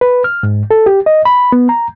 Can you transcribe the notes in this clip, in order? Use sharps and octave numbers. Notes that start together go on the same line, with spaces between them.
B4
F6
G#2
A4
G4
D#5
B5
B3
A#5